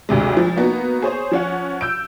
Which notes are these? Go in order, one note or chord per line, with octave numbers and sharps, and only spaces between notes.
G#1 D2 C3 G#3
F3
A#3 B3 D#4 F#4
G#4 C5 C#5
F3 C#4 F#5
E6 G6 D7